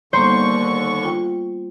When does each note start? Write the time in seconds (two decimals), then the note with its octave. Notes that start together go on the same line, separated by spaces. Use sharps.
0.13 D#2 D3 G3 A#3 B3 C5 C#6
1.03 F4 G5